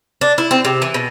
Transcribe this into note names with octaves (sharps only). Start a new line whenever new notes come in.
D4
E4
C4
C3
E3
B2